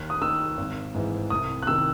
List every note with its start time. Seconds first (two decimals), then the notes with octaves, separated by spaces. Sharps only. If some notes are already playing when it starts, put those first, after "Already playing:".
Already playing: D#2 F#6
0.10 D#6
0.22 D#3 E6
0.57 G#1
0.94 G#2 E3
1.30 C2 D#6
1.63 F#6
1.67 C3 D#3 E6